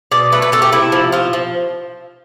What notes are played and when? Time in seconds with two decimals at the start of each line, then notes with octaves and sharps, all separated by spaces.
0.12 B2 D5
0.32 A3 B4
0.42 B4
0.52 A3 A4
0.62 G4
0.72 C3 E4
0.92 F3
1.12 F3 F4
1.33 F3